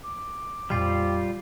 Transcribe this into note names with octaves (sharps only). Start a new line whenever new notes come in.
D6
F2 A#2 G3 F4 G5 D6